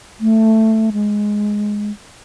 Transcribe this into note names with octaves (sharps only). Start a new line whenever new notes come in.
A3
G#3